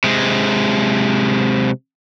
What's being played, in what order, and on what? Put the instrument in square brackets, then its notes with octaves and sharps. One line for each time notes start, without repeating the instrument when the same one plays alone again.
[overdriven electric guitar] C3 G#3